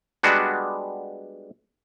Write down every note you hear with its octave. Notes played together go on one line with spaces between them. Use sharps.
G3 G#3 B3 D4 F#4